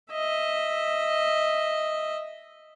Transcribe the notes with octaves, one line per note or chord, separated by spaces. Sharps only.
D#5 E5